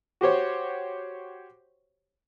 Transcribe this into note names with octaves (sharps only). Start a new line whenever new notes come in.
F#4 G4 C5 C#5